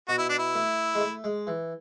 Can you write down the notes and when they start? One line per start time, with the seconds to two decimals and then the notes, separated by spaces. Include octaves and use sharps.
0.09 B2 F#4
0.18 E4
0.29 D4
0.39 E4
0.55 A3
0.95 G#3
1.01 A3
1.24 G#3
1.47 E3